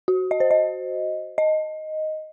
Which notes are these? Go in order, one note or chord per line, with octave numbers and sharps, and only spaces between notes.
F#4
D#5
C5
D#5
D#5